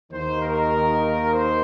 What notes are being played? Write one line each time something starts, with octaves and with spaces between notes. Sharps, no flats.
D#2 D#3 C5
A#4
C5